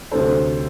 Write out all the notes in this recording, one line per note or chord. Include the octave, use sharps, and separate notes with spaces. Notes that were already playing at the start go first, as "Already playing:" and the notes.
D2 C3 F#3 A4 C5